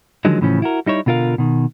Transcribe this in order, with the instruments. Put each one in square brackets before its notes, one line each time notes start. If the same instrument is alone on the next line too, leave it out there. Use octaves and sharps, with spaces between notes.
[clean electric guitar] D3 D#3 F3 F#3 G#3
A2 C#3 E3 F3 C#4
E4 F#4 A#4
G3 D#4 E4 C#5
B2 D3 F4 A#4 F5
B2 D#3